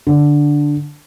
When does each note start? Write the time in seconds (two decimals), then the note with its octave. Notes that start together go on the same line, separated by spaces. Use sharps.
0.07 D3